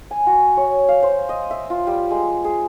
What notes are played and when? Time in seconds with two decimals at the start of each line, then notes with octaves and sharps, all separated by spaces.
0.11 G#5
0.27 F#4
0.57 C#5
0.89 F5
1.03 C5
1.29 D#5
1.51 E5
1.70 F4
1.87 G3
2.11 G#3
2.44 G#4